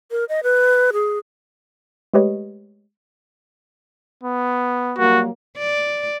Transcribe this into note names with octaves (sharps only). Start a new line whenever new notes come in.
A#4
D#5
B4
G#4
G#3 A3 G4 B4 C#5 D#5
B3
F#3 G3 A#3 F#4
D5